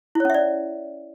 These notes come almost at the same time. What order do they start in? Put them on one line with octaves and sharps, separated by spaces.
E4 C#5 C#4 E5 D5